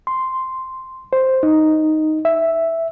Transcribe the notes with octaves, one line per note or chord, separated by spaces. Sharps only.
C6
C5
D#4
E5